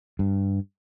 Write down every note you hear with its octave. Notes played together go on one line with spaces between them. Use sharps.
G2